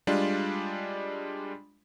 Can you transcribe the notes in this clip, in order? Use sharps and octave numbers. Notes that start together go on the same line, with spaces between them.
G3 G#3 D4 F4